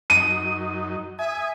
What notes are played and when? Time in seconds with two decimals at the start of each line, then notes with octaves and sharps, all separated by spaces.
0.10 F#2 D#4 D#7
1.19 E5 G#5 D#6